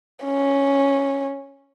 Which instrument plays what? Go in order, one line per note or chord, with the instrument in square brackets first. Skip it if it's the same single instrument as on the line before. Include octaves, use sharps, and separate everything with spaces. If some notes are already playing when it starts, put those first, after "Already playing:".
[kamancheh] C#4